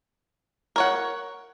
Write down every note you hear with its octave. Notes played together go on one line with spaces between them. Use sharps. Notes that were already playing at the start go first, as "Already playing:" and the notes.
A#4 C#5 F#5